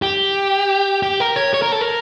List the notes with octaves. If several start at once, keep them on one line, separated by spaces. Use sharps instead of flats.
G4
G4
A#4
C#5
C#5
A#4
A4
A#4